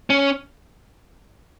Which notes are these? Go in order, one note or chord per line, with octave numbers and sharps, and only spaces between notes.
C#4